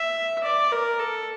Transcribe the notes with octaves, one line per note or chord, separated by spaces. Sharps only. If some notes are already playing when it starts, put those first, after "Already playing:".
Already playing: E5
D5
A#4
A4